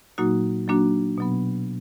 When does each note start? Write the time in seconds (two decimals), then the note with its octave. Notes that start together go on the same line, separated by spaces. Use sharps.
0.18 A#2 F#3 A#3 D#4 F#4
0.68 F#3 A#3 D4 F#4
1.18 B2 F#3 B3